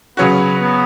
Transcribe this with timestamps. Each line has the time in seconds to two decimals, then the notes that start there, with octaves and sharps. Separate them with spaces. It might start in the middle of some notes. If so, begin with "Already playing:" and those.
0.17 C#3 F#3 B3 C#4 F#4
0.60 B3